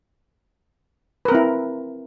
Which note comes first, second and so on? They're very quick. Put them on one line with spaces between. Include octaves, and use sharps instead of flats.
B4 A#4 C4 E4